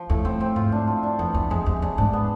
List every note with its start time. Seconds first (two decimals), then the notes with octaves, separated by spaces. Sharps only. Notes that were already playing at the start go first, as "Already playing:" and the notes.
Already playing: F3
0.09 E2 A2
0.25 E2 C4
0.40 F2 C4
0.56 G#2 F4
0.72 D4
0.87 F4
1.03 D4
1.19 F2 B3
1.34 F2 E3
1.50 F2 G#3
1.66 E2 C3
1.82 F2 D4
1.97 G#2 D4
2.13 B3